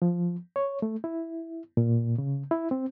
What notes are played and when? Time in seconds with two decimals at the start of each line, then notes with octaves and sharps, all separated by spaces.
0.02 F3
0.56 C#5
0.82 A3
1.04 E4
1.77 A#2
2.18 C#3
2.51 E4
2.71 C4